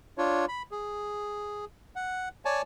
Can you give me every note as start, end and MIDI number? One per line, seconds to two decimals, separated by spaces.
0.18 0.45 62
0.18 0.45 65
0.18 0.45 73
0.48 0.63 83
0.71 1.65 68
1.96 2.29 78
2.45 2.62 73
2.45 2.62 74
2.45 2.62 80
2.45 2.62 81